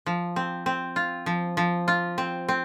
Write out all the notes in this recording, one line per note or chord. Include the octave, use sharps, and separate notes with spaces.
F3
C4
C4
F4
F3
F3
F4
C4
C4